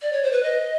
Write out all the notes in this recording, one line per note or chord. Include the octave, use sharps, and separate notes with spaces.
D5
C#5
C5
B4
D#5